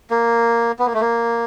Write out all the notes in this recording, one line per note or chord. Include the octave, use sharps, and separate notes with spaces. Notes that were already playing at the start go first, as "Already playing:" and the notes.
A#3
B3
A#3
A3
A#3